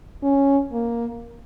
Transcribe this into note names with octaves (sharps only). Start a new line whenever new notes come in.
C#4
A#3